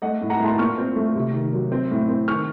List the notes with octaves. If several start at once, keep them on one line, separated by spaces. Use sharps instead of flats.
A3 D#5 F#5
A2
F#5 A#5
A2 A5 C6
A#2 C#6 F6
C4
A3
C3
D#3
F#3
C4
A2
C4
D#3 C#6 F6